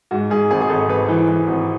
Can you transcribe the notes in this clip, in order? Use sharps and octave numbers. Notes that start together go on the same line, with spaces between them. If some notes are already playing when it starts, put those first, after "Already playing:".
G#2 F#4
G#2 G#4
G#1 G#4
G#4
G#1 A4
G#1 B4
E3
E3
G#1